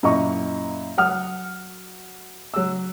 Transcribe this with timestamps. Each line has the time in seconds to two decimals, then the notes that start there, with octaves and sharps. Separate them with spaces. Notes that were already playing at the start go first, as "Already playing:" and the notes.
0.03 F#2 A#2 E4 D#5 A#5 C#6
0.98 F#3 F#5 D#6 F6
2.54 F#3 E6